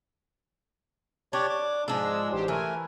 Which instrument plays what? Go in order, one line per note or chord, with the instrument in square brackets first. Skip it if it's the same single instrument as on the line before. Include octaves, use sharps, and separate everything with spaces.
[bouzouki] D4 [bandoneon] G4 C#5 D5
[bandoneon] D6
[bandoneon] G#2 E6 [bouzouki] F3 D4 [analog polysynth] G#3
[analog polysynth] A1 G4 C5 [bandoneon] F#3
[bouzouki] E3 [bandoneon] A3 A#4 [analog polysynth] G#5